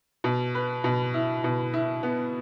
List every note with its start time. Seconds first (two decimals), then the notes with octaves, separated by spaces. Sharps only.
0.24 B2
0.55 B4
0.84 B2
1.14 E4
1.44 B2
1.73 E4
2.03 B3